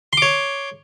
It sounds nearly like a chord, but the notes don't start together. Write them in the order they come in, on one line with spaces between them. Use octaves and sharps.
C6 D6 C#5